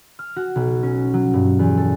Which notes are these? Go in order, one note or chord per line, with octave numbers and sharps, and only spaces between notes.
F6
F#4
B1
C#4
F#3
G2
E2
A4